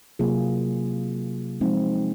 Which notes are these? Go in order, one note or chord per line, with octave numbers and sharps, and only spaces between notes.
C3 F#3 A#3 F4 G#4
F3 G#3 C4 D#4